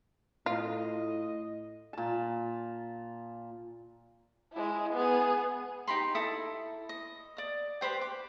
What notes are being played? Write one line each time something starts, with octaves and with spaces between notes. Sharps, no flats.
A2 F4 D#5
A#2 A5
G#3 E4
B3 G#4
D#4 G4 B5 C6
E4 A4 D#6
D#5
D5 D#6
G4 B4 C5 G5
D6